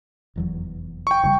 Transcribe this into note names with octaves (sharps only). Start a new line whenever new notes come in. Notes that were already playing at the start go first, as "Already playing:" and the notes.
F1 E2 F#3
G5 C#6
F#1 C#3 G3